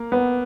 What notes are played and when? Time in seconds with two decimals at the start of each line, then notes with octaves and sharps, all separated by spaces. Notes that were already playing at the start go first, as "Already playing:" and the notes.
Already playing: A#3
0.12 B3